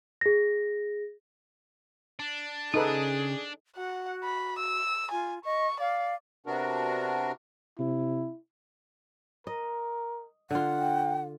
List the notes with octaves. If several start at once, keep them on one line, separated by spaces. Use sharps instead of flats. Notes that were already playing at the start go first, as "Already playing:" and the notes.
G#4 A#6
D4
C#3 D#4 G#4 A4 B4 D#6
F#4 F#5
B5
E6
F4 G#5
D#5 C#6
D5 F5
C3 B3 D4 F#4 A#4
C3 E4
A#4 D#5
D3 F4 F#5
G5